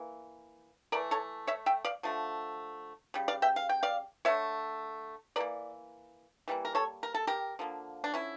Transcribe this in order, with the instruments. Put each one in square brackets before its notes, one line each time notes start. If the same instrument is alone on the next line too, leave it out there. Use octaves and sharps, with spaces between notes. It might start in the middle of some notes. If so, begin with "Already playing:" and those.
Already playing: [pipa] E3 A#3
E3 A3 A#4 D5
A4 C#5
C#5 E5
E5 G5
D5 F5
D3 F3 A3
C#3 G3
D5 F5
E5 G5
F5
G5
D5 F5
D3 A3 C#5 E5
E3 A#4 D5
A#3
E3 G3 A#3
A#4
A4 C#5
A#4
A4
G4 A#4
D3 F3 A#3
D4
C#4 E4